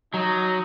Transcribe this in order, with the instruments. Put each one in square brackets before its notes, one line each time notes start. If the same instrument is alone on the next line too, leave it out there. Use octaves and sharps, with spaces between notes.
[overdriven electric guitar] F#3 [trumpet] D#4